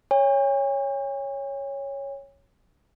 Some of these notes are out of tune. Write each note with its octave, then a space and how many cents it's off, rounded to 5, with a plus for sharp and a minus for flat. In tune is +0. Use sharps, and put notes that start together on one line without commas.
C#5 +0 G#5 -45